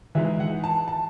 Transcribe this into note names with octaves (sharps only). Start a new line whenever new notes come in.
E3 G#3 D#4 E5
F#5
A5
A5